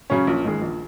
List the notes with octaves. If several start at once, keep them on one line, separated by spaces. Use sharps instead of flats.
C#3 F#3 C#4
A#1
G#2 D#3 G#3
A#1